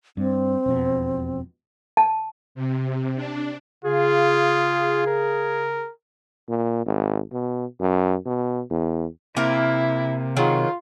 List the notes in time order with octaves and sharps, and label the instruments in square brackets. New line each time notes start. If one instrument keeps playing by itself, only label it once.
[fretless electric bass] G2 [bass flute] C4
[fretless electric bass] E1 F2 B2
[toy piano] A5
[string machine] C3
D4
[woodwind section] C#3 G#4 [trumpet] F4
[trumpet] A#4
[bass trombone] A#2
G#1
B2
F#2
B2
E2
[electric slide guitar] C3 [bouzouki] A#3 A#4 [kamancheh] E4
[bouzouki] D#3 F#3 G#3 [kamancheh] F4